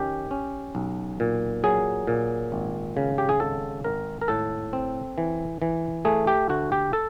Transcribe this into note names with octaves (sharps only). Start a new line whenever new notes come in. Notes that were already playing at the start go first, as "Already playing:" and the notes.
Already playing: D#3 C#4 G4
C#4
B1
A#2
F#3 G#4
A#2
G#1
C#3
G4
G#4
G#1 A4
G#1 A#4
A#4
A2 A4
C4
E3
E3
A3 G#4
G4
D2 F#4
G4
A4